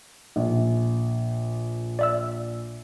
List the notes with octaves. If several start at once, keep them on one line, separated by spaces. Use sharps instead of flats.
A#1
D5 E5 E6